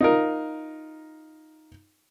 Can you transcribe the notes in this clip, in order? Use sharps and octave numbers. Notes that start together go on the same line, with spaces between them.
D#4 F4 A#4